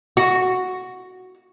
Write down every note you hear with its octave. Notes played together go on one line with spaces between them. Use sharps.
F#4